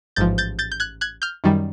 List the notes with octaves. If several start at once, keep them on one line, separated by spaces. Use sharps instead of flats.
A1 G#2 F3 G6 A6
G6 A6
G6 A6
G6
F#6 G#6
F#6 G#6
F6 G6
F#2 D#3 G3